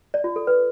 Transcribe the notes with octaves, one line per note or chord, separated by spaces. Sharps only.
D5
F4
A4
B4